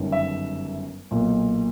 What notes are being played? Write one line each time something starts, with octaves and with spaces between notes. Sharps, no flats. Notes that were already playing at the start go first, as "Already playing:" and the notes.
Already playing: G1 F#2 D#3
E5
B1 A#2